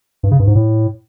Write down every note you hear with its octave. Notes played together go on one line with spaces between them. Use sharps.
G2
C#3
G2
G#2
A2